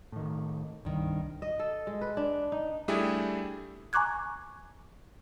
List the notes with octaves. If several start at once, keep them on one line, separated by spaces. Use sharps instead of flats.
A2 D#3
C2 G2 D#3
D#5
A4
G#3
B4
D4
D#4
G3 A3 D4 E4 G4 G#4
G#5 A#5 C#6 D6 F#6 G#6